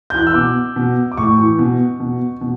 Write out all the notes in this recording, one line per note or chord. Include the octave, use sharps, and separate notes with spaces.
G6
E3 F#6
E6
B2 D6
B2
D6
A2 C#6
E3
B2
B2
B2